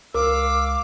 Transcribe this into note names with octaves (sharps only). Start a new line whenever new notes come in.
C#2 A#4 F5 D6 E6